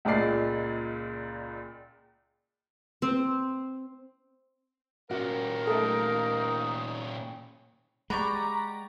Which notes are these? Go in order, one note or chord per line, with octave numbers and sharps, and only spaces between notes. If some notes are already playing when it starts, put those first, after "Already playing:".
C#2 A#2 G#3 D5 C7
C4
A#2 C#4 F#4 A#4 F5
A3 D#4 A4
G#3 G4 D5 F#5 A#5 B5 C#6